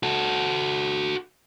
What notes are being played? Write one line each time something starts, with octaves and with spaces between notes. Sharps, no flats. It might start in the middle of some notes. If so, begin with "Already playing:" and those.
F#4 A4